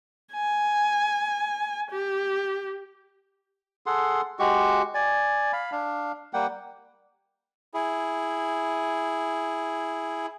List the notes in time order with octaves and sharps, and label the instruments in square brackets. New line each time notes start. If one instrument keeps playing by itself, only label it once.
[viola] G#5
G4
[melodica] G#4 A4 F#5 C6
G#3 F#4 G4 C#6
D5 G#5
F5 B5
D4 F5
G3 A#3 F#5 G5
[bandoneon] E4 G#4